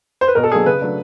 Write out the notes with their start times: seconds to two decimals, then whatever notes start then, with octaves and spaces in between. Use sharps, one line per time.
0.21 C5
0.28 B4
0.35 B2 A#4
0.43 A4
0.51 F#3 A#3 D4 G#4
0.66 C#3 B4
0.81 F#3 A3 D4